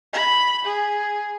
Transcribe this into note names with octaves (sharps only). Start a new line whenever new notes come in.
B5
G#4